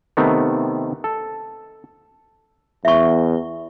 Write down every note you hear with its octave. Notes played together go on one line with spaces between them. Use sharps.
C3 D#3 A3 B3 C4
A4
E2 E5 C#6